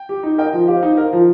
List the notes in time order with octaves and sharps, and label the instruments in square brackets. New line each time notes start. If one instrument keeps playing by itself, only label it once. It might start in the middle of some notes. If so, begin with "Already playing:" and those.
Already playing: [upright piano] G5
[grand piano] G4
D#4
[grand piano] A#4 [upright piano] D#5 G5
[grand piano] F3
[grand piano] G4 [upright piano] C5 F5
[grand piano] D#4
[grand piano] A#4 [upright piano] C5 F5
[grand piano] F3